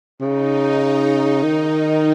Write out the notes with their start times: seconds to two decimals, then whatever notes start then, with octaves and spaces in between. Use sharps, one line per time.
0.20 C#3 D#4
1.43 D#3